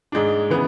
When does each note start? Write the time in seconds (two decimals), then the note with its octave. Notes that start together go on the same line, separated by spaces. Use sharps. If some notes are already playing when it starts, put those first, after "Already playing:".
0.12 G#2 G#3 D4
0.50 C#3 E3 B3